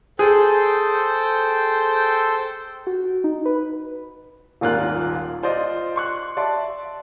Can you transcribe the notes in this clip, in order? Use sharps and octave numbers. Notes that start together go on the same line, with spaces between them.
G#4 A4 C5 G5
F#4
D#4
B4
D#1 G#1 D#2 F4 A#4 F#6
F4 C5 D5 D#5
C6 C#6 F#6
D5 E5 A5 C6